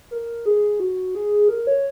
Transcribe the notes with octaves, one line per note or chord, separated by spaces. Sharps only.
A#4
G#4
F#4
G#4
A#4
C#5